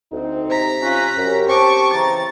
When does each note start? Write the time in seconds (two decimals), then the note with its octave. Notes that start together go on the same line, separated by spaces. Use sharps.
0.12 D2 C4 D#4
0.50 C3 A#5 B6
0.82 C#4 F4 F#6
1.17 F#2 C#4 G4
1.48 C4 A5 C#6 D6
1.93 C#3 E3 A#5 A6